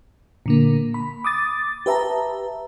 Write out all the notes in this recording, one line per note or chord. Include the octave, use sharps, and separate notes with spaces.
A#2 D3 A#3
B5
D6 D#6 A6
G4 B4 E5 A5 A#5